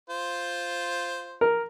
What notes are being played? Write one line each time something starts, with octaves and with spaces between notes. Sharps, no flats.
F4 C5
A#4